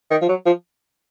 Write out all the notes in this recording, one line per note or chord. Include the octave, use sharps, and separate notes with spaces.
D#3
F3
F#3
F3